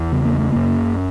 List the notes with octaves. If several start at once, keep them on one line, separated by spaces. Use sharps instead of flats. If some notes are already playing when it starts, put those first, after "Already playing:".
Already playing: E2
C#3 B3
A#3
A3
F#2 A#3